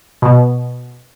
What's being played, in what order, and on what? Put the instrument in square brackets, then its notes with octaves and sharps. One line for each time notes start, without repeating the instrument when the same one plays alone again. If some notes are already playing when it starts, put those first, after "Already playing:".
[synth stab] B2